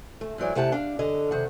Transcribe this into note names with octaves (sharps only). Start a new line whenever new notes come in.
A3
G#2 E3 F#3 D5
C3 A3 E4 G4 F#5 A5
D4 F5
D3 D#5
C3 D#3 F#5